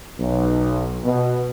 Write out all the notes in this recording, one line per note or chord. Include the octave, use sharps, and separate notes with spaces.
B1
B2